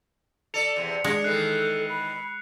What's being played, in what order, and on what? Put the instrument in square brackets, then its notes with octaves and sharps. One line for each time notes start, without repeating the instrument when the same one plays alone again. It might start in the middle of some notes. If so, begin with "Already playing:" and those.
[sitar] A4 D5 [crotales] C#7 F7
[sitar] E2 C3
[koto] G#3 [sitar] D4
[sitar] D#3 E3 [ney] A4 [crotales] F#6 C7
[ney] B5